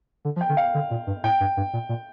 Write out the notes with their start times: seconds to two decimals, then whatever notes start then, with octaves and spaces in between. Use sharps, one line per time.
0.25 D3
0.36 F3
0.41 G5
0.49 D3
0.57 F5
0.74 D3
0.91 A#2
1.07 G2
1.24 A2 G5
1.40 G2
1.57 G2
1.73 A#2
1.89 A#2